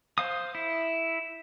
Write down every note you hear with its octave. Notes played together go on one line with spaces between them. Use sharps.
C5 F5 D#6
E4